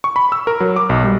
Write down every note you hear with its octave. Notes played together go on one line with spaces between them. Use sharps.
C#6
B5
E6
A#4
F#3
D6
B1
G3